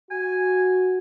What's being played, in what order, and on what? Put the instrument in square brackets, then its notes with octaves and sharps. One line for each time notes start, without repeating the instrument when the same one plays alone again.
[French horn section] F#4 [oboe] G#5